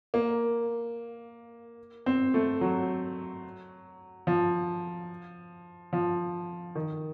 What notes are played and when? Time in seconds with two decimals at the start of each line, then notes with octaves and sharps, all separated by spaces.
0.14 A#3
2.06 C4
2.34 A3
2.61 F#3
4.27 F3
5.93 F3
6.75 D#3